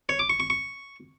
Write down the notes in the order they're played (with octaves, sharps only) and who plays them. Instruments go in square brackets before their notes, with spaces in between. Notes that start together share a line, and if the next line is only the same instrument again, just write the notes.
[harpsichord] C#5
D6
C#6
C#6
C#6